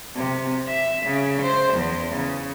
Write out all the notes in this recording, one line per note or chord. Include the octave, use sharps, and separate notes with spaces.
C3
E5
C#3
C5
E2
C#3